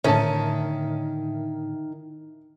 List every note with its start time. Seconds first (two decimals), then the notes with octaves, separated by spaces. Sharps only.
0.04 A2 D3 D#3 C#4 E5 A5